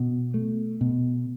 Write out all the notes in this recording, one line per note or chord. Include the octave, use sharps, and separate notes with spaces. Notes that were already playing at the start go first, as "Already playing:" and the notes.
Already playing: B2
A3
B2